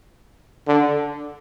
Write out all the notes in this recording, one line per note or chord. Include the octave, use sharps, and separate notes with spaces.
D3